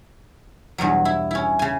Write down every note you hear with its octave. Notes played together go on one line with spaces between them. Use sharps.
E2 G2 B2 F#3
E4
C#4 E4
C#3 G#5